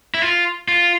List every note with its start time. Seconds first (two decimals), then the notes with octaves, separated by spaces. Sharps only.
0.14 E4
0.22 F4
0.68 F4